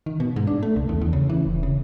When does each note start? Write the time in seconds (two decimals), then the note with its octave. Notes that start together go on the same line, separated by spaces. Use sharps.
0.06 D#3
0.20 B2
0.36 G#2
0.47 D4
0.63 A3
0.76 C#2
0.89 E2
1.01 E2
1.13 C#3
1.29 E3
1.47 E1
1.63 C#3